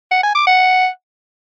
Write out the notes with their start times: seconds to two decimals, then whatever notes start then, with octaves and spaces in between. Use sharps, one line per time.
0.11 F#5
0.23 G#5
0.35 D6
0.47 F#5